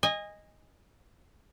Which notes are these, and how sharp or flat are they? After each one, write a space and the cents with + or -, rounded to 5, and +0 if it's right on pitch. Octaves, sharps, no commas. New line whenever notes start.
D#5 +0 G#5 -25